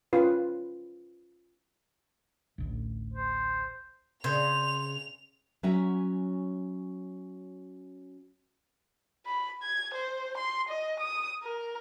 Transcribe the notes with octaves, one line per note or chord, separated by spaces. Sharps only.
C#4 F4 B4
A1 D2
C5
C#3 C5 F7
F#3 C#4 F#4 E5 G#5 A#5
B5
G#6
C5
C6
D#5
D#6
A#4